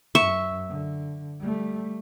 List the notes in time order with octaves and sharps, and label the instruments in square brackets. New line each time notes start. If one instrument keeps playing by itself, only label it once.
[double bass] F#2 [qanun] E5 [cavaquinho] C#6
[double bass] D3
G3 A3